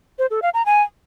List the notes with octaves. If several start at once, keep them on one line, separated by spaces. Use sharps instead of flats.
C5
A4
F5
A#5
G#5